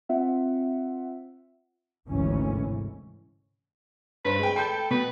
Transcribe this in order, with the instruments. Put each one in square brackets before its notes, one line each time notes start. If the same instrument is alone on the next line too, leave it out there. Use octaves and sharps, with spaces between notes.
[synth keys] C4 F4 E5 F#5
[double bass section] G#1 D2 G#2 C3 E3 C#4
[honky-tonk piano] G2 C5 [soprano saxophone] B4
[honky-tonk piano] G#3 G5
[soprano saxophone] A4 [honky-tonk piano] G5 B5 G6
[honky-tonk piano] B2 [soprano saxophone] B4